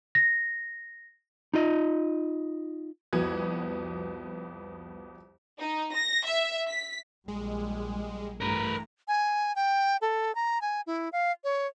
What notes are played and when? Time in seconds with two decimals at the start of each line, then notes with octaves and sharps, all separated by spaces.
0.15 A#6
1.54 D#4 F4 D#5
3.13 C2 F2 B3 F#4 G#6
5.58 D#4
5.93 A#6
6.25 E5
6.68 B6
7.28 A#1 G3 G#3
8.41 G2 E3 A3 A#4 B4 A#5
9.08 G#5
9.56 G5
10.01 A4
10.35 A#5
10.62 G#5
10.87 E4
11.12 F5
11.44 C#5